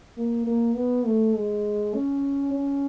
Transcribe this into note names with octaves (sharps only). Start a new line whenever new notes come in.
A#3
A#3
B3
A3
G#3
C#4
C#4